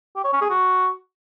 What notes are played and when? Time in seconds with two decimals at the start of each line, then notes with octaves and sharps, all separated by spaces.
0.16 G4
0.24 C#5
0.33 C#4
0.41 G#4
0.50 F#4